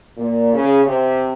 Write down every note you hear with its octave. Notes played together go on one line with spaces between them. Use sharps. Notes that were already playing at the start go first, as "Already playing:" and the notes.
A#2
C#3
C3